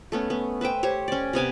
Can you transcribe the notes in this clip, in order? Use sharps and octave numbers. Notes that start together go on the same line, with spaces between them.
A3 B3 C#4
B3
B4 C5 E5 G5
G4 C5 C#5
C#4 D5
C3 B3 G#5 D6